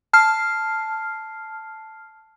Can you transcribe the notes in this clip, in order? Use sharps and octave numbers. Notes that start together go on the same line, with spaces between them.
A5 F6 C7